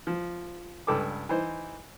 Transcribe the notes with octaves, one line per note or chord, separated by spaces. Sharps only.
F3
C#2 G2 A4 G5 G#5 D6
E3 D#4 C5